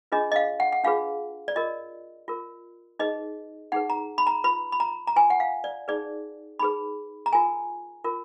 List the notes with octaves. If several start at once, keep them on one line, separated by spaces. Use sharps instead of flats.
D4 F4 G#4 B4 D#5
D#5
F5
F#5
F#5
D4 F4 G#4 B4 F5
D5
F4 A#4 D#5
F4 A#4
D#4 G#4 B4 D#5
D#4 G#4 B4 F#5
A#5
B5
A#5
F4 B4 B5
B5
A#5
A#5
F4 B4 G#5
F#5
F5
D5
D#4 G#4 B4 D5
D#4 G#4 B4 B5
A#5
F4 A#4 G#5
F4 A#4